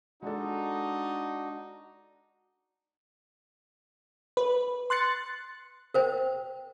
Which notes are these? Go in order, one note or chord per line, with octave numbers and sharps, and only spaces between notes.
G#3 D4 D#4 F#4 A4
B4
C6 F#6 A6 C#7
A#4 C5 G5